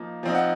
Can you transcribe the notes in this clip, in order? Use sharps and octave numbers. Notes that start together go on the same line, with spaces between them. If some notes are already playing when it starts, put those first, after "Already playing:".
Already playing: F3 A#3 D#4
F3 C4 D#4
F#5